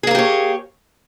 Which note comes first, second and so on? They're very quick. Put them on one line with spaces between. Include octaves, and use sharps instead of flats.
G#4 A#3 A#4 G4 C#5